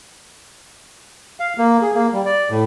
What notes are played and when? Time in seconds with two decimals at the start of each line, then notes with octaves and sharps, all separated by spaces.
1.40 F5
1.58 A#3
1.82 G#4
1.95 A#3
2.13 G3
2.26 D5
2.50 A2